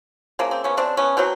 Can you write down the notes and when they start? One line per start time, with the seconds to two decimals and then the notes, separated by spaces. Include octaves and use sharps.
0.39 C#3 F3 A#3
0.51 C4
0.64 B3 C#4
0.77 C4 D4
0.97 B3 C#4
1.17 B2 F#3 C4